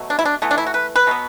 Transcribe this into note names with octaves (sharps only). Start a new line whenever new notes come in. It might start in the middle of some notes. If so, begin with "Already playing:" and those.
Already playing: B2 F#3 A3
D4
E4
D4
E3 A3 B3
D4
E4
F#4
B4
B4
B2 F#3 B3